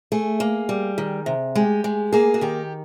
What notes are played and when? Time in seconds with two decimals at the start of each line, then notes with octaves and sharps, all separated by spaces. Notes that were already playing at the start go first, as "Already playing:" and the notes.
0.12 A3 G#4
0.40 A#3
0.69 G3
0.98 D#3
1.26 C3
1.55 G#3 G4
1.84 G#3
2.13 A#3 G#4
2.34 F#4
2.41 D#3 G4